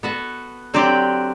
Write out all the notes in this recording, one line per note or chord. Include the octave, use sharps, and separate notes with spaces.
B3 F#4 A4
D3 F#3 C4 G4 D5